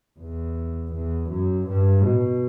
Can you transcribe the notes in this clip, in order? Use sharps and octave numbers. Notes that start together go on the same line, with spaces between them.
E2
E2
F#2
G2
B2